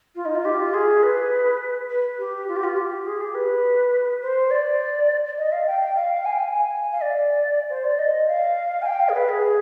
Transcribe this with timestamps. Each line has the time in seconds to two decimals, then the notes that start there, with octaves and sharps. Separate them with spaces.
0.15 F4
0.25 D#4
0.36 F4
0.45 G4
0.60 F4
0.74 G#4
1.03 B4
1.90 B4
2.18 G4
2.48 F4
2.57 G4
2.64 F4
2.77 G4
3.06 G#4
3.21 G4
3.34 B4
4.22 C5
4.51 D5
5.38 D#5
5.52 F5
5.67 G5
5.81 G5
5.96 F5
6.25 G#5
6.32 G5
6.39 G#5
6.92 F5
7.02 D5
7.70 C5
7.84 D5
7.99 D#5
8.28 F5
8.82 G#5
8.86 G5
9.00 F5
9.09 G#4
9.14 B4
9.29 G#4